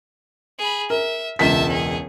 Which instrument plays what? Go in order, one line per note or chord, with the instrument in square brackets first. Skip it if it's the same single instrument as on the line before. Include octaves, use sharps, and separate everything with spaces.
[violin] G#4 B5
[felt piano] A#4 [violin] E5
[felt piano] E1 C#2 B6 [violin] E5 A5
[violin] C#4 G#4